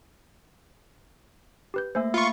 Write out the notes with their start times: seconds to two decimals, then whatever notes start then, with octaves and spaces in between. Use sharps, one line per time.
1.74 G4 B4 G6
1.95 A3 A#3 C5 E5 G#5 E6
2.14 F4 B5 C#6 C#7